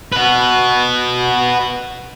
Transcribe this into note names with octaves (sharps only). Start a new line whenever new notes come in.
F#4 B4